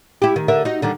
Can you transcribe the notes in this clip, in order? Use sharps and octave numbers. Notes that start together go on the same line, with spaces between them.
E4 G4
D#3
D3 A#4 E5
D#4 F#4
D3 D#3 G3